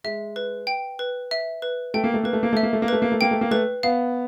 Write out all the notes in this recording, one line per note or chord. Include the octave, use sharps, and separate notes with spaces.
G#3 E5
B4
G5
B4
E5
B4
A3 G5
A#3
A3
A#3 B4
A3
A#3
A3 E5
A#3
A3
A#3
A3 B4
A#3
A3
A#3 G5
A3
A#3
A3 B4
B3 F5